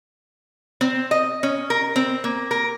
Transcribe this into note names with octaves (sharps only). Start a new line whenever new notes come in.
C4
D#5
C#4
A#4
C4
A#3
A#4